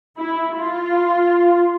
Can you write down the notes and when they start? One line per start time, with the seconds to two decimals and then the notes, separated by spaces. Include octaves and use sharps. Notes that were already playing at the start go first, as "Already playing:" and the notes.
0.17 E4
0.58 F4